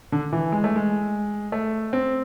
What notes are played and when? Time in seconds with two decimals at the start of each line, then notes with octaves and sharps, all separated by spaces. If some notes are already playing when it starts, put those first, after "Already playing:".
0.12 D3
0.33 E3
0.52 G#3
0.64 A3
0.76 G#3
1.52 A3
1.93 C4